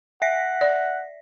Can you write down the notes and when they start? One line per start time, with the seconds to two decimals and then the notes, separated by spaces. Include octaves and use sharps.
0.22 E5 F#5 A#6 B6
0.61 D5